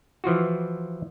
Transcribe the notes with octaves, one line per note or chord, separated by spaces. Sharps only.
E3 F3 F4 F#4